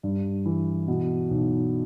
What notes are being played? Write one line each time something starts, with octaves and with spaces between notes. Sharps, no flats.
G2
E3
B2
B1